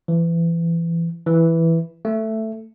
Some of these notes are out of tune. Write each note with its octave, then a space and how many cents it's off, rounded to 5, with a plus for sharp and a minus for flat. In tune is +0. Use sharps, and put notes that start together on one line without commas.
E3 +25
E3 +0
A3 +5